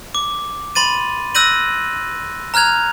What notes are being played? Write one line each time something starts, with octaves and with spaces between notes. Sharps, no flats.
D6
B5 C6 A6 D#7
E6 F#6 G6 A#6 D#7 F#7
A#5 F6 F#6 G#6 F7